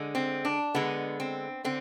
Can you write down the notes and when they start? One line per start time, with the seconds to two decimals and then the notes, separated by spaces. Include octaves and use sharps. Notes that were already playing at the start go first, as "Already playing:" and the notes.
Already playing: D3 G#3
0.15 C4
0.45 D4
0.75 D3 G#3 B3
1.20 C4
1.65 D3 C4